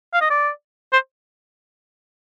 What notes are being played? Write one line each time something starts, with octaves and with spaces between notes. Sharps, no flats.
F5
D#5
D5
C5